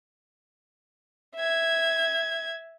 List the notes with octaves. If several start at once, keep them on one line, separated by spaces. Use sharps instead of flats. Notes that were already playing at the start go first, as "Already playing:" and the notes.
E5 G#6